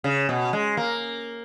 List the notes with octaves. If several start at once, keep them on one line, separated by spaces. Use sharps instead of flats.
C#3
B2
G#3
A#3